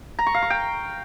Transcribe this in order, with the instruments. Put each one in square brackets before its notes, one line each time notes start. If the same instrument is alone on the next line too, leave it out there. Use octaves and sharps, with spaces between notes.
[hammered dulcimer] A#5
C#6
F5
C#6
G5